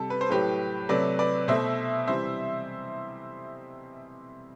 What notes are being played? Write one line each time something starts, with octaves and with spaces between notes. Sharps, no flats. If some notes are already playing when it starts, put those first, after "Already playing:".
Already playing: C3 G3 A4
B4
C5
A2 F#3 A3 G4 B4
C3 F#3 A3 B4 D5
B4 D5
B2 A3 C5 E5
C3 E3 G3 C5 E5